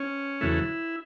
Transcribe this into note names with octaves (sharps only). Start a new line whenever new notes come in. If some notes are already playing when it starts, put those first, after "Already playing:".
Already playing: C#4
E2 C#3 F#3 A3 E4